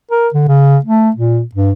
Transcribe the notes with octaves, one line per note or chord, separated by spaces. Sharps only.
A#4
D3
C#3
A3
A#2
G2